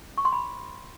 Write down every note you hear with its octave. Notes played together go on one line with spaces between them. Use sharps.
C#6
C6
B5